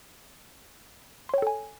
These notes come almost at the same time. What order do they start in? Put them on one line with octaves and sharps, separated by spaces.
C6 C#5 G5 A4 G#5